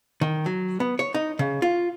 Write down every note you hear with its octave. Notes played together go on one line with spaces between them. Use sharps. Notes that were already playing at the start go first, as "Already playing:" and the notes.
D#3
F#3
B3
C#5
D#4
C#3
F4